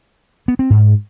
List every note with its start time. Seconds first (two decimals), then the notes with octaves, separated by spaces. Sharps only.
0.48 B3
0.59 C4
0.70 G#2